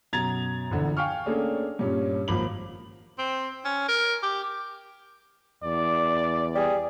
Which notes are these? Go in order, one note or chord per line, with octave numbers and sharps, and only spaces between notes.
F#2 B2 A#5 G#6 A6 F7
A#1 E2 D3 F3
F5 G5 G#5 C#6 F6
A3 A#3 C#4 D4 G#4 A4
G2 A#2 C#4
G#1 F3 A#3 B5 D6 F#7
C4
C#4
A#4
G4
E2 D5
G3 G#4